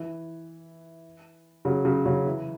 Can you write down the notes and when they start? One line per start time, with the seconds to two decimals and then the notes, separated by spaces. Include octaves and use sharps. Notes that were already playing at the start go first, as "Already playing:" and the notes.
Already playing: E3
1.65 C#3 F#3
1.85 C#3 F#3
2.06 C#3 F#3
2.26 E3